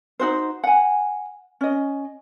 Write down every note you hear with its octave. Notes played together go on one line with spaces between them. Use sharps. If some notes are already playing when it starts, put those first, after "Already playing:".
D#4 F#4 C5
F#5 G#5
C#4 D#5